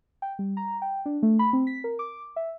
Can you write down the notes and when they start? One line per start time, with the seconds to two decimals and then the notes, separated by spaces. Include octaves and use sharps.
0.22 G5
0.39 G3
0.57 A#5
0.82 G5
1.06 D4
1.23 A3
1.39 B5
1.53 C4
1.67 B6
1.84 A#4
1.99 D6
2.36 E5